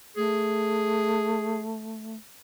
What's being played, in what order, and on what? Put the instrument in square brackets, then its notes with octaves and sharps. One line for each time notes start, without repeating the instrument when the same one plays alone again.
[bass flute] A3 [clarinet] G#4